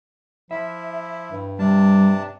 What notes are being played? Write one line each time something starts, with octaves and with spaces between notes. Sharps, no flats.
F3 E4 E5
G2
C3 G3 D4 A5